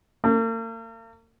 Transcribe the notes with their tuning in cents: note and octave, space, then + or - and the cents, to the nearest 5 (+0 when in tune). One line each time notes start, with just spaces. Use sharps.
A#3 -45